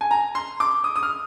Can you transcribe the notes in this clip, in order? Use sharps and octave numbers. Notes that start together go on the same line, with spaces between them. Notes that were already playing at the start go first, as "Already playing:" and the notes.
G#5
A#5
C6
D6
D#6
D#6
F6